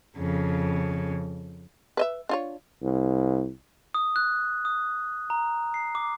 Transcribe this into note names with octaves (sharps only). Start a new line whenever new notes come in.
F2 C#3
B4 D#5 E5
D4 F4 C#5
C2
D#6
F#6
D#6
A#5
C7
D6